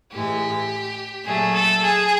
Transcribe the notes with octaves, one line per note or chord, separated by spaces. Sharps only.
A2 E3 G#3 G4
A#2 F#3 A3 G#4
A4
G#4